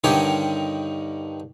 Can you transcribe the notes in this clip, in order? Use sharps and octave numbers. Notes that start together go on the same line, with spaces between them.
G2 D3 D#3 G4 C#5